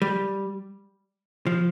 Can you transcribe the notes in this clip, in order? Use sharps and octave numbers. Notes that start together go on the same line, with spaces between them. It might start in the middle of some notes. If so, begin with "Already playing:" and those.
G3
F3